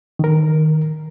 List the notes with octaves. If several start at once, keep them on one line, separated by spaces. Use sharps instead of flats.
D#3 A#4